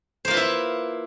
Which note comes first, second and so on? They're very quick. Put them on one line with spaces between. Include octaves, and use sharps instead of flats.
C5 A#3 F4 B4 E4